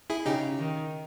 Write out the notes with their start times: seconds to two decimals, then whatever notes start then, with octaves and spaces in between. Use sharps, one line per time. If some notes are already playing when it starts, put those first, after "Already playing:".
0.10 E4 G#4
0.26 C#3 D#4 G4
0.59 D#3